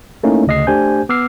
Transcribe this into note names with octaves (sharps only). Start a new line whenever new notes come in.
A3 A#3 C#4 D#4 E4
D2 C#3 D#5 D#6 C7
A3 D4 G4 C5 G#5 G6
B3 D6 E6 F6 C7